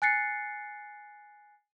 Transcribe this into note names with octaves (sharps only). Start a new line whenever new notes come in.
G#5 F#6 A6 C7 C#7